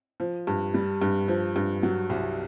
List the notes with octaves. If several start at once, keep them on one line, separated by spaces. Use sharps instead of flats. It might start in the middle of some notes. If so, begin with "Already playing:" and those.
F3
G2
G3
G2
F3
G2
F#3
C2